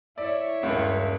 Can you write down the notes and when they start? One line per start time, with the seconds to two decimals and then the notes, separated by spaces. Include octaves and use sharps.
0.18 E4 C#5 D5 E5
0.63 D#1 C#2 G2